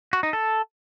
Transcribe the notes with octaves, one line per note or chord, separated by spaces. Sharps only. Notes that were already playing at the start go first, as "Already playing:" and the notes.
F#4
D#4
A4